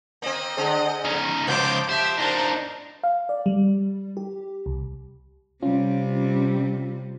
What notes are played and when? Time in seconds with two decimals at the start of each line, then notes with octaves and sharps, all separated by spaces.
0.22 A#3 C4 D#5
0.57 D3 G#3 C4
1.05 C#4 D#4
1.47 C#2 F3 A#3 B3 C5 D6 G6
1.89 G4 C5 E5
2.18 D4 D#4 A#4 C5
3.04 F5
3.29 D5
3.46 G3
4.17 G4
4.66 C2
5.62 C3 G3 C#4 F4